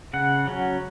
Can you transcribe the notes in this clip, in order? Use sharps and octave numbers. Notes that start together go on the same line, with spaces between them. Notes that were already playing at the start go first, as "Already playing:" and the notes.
C#3 F#5
F#3 C#4